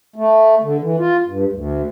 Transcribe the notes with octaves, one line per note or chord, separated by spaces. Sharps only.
A3
D3
E3
F4
G2
D2